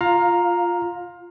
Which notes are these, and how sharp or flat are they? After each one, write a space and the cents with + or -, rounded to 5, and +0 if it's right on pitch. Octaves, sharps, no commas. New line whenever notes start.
F4 +0 F5 +20 A#5 +0